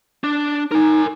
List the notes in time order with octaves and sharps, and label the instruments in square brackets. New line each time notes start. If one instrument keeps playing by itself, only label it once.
[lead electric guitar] D4
[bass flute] D#4 [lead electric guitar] A#4 G#5